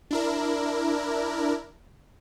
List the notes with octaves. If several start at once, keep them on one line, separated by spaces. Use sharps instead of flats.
D4 E4 A#4